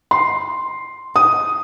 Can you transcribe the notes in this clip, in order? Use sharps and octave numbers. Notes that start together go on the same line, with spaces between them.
C6
D#6